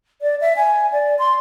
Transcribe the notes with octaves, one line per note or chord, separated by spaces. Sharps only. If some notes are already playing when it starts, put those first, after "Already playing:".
D5
E5
G#5
D5
C6